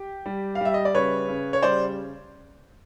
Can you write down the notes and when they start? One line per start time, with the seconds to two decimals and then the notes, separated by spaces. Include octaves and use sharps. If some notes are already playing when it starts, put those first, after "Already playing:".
Already playing: G4
0.26 G3
0.55 F5
0.60 G3 E5
0.74 D#5
0.85 D5
0.95 C#3 B4 C#5
1.28 C#3
1.53 C#5
1.63 G3 C5 D5